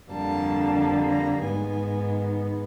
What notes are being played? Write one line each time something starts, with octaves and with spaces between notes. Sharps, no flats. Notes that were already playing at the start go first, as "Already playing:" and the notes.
F2 D3 G3 A#3 A5
A#5
G#2 D#3 G#3 B3 G#5